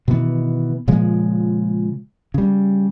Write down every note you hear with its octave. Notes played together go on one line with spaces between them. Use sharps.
B2 D#3 E3 B3
A#2 C#3 F3 G#3
C#3 G3